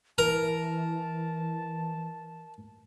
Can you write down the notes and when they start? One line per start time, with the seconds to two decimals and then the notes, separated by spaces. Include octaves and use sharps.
0.18 E3 A#4 A5